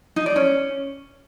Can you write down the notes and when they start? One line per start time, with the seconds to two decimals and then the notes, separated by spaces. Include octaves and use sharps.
0.16 D#4
0.26 D5
0.36 C#4